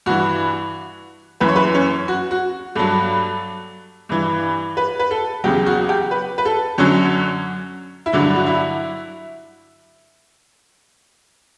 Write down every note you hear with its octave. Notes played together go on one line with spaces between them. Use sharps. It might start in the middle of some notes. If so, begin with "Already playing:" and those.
G2 E3 F#4
F#2 E3 B4
C#5
B4
C#4
F#4
F#4
G2 F#3 A4
G2 E3
B4
B4
A4
E2 C#3 F#3 G4
F#4
G4
B4
B4
A4
F#2 D3 F#3 C#4
E4
G2 D3 F#3 D4
F#4
E4